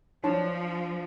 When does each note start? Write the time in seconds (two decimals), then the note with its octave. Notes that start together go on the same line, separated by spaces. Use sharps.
0.24 F3 D4 C#5 A5 C6